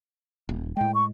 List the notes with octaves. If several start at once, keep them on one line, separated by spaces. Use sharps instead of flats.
D#1
A2 G#3 G5
C#6